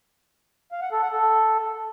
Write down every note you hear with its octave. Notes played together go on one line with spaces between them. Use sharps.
F5
F#5
A4
F#5
A4